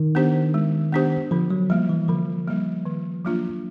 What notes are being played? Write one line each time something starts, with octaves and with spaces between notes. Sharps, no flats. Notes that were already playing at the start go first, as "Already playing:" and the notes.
Already playing: D#3
B3 D4 G4 C5
G#3
B3 D4 G4 C5
D3 F3
F#3
F3 G3 A#3
E3
D3 F3
G3 A#3
D#3
F#3 A#3 D4 F4